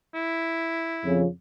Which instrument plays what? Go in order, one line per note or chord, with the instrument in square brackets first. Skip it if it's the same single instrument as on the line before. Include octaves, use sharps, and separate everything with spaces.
[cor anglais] E4
[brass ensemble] F2 C#3